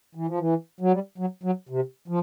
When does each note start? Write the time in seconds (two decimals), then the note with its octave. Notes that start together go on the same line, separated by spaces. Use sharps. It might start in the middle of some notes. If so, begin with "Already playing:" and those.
0.15 E3
0.27 F3
0.38 E3
0.81 F#3
0.92 G3
1.18 F#3
1.43 F#3
1.69 C3
2.08 F3